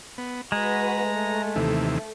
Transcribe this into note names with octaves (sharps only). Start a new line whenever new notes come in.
B3
G#3 F#4 B4 A#5
A3
D#2 C3 E3